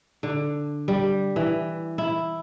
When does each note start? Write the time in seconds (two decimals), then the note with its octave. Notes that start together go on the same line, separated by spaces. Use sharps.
0.23 D3
0.88 G3
1.36 E3
1.98 E4